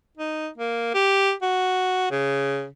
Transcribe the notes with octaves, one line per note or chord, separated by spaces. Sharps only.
D#4
A#3
G4
F#4
C#3